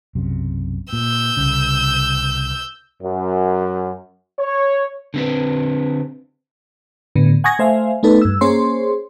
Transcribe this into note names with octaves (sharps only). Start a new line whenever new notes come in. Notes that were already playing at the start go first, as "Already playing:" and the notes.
B1 F#2 C3
A#2 E6 G6
C2 C#3
F#2
C#5
D3 C4 B4
A2 D3 B3
F#5 G#5 C#6 D#6 G#6 A#6
A3 C5 E5 F5 G#5
A3 B3 D#4 A4 B4
G2 E6
A#3 C#4 G#4 C5 C#5 C6